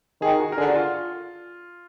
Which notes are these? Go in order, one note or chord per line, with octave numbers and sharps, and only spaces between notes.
D#3 G#4
F#4
A#4
D3 G#4
F#4
F4